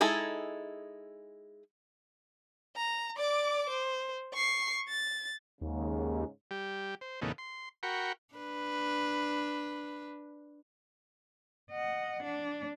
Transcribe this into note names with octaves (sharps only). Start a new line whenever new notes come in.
G#3 D#4 E4 G#4 A4
A#5
D5 D6
C5
C#6 C7
A6
D#2 G#2 C#3
G3 G4
C5
E2 A#2 C#3 A3 B3 D#4
C6
F#4 A#4 G5 B5 C#6
D4 B4
D#5 F#5
D4